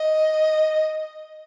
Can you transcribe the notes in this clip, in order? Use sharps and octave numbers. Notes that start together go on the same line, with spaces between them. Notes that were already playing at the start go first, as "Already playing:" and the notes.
Already playing: D#5